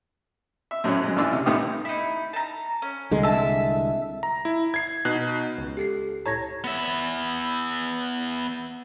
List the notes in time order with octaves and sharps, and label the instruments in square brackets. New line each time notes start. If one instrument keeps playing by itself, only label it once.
[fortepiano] E5
F#2 A2 F#3 C4 C#4
F#2 G#3
A1 D#2 E3 D4 D6 E6
C3
C#2 A2 D#3 B3 G4 D#6
[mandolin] D#4 E4
A5 A#5
C#4
[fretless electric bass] C2 D3 G#3
[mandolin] E5 A5
[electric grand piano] A#5
E4
G#6 C7
B2 D#4 F#6
[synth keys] C#2
[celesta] G4 A4 C7
[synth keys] A2 C#5 A5 [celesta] A#5 G#6 A#6
[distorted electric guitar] B3 E5